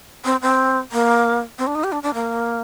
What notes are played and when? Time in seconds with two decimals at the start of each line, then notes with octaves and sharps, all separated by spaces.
0.25 C4
0.42 C4
0.92 A#3
1.58 C4
1.67 D4
1.75 D#4
1.84 G4
1.92 D4
2.03 D4
2.14 A#3